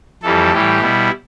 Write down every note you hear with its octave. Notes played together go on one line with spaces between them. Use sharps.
F2 E3 G3 A4
A2 E3 G3 G4
B2 G3 E4